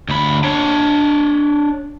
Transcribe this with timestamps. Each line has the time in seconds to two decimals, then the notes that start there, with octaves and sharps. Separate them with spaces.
0.09 D2 B5
0.44 D4 C#5